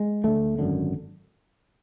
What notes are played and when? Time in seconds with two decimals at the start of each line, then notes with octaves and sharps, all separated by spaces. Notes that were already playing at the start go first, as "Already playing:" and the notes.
Already playing: G#3
0.24 D2 D3 A3
0.59 G#1 F#2 D3